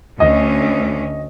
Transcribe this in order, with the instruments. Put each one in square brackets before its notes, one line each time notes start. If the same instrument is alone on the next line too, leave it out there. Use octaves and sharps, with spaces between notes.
[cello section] D2 C#4 [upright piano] D#5